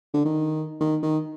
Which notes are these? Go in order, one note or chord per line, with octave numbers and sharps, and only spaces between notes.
D3
D#3
D#3
D#3